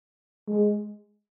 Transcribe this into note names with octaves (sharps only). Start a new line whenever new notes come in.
G#3